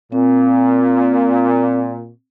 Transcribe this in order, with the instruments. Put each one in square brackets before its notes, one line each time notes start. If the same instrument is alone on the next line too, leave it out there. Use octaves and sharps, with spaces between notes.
[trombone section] A#2 [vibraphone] C4